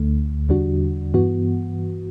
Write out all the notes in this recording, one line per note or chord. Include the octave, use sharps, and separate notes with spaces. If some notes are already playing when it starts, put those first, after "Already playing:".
Already playing: D2 D3 A3
E2 D3 G3 D4 F#4
G2 E3 B3 F#4